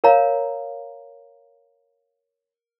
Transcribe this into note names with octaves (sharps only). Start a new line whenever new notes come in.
A#4 C#5 F5 A#5